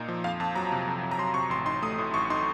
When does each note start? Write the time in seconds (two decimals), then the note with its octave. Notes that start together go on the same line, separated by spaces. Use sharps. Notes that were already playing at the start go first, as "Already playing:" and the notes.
Already playing: A#2 A#3 D#4
0.08 F3
0.24 F2 F5
0.40 F2 A5
0.55 F#3 A#5
0.72 C3
0.87 F2
1.03 F2
1.11 A#5
1.18 F#3 C6
1.34 C3 C#6
1.50 A1 C6
1.66 D#4 C6
1.82 A3 D#6
1.98 A2
2.14 A1 C#6
2.30 D#4 C6